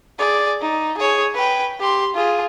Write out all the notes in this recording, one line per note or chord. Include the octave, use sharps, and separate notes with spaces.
G#4 D5
D#4
G#4 C#5
B4 G5
G4 C6
F4 G#4